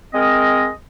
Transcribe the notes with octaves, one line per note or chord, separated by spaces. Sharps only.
G#3 C4 A#4 D#5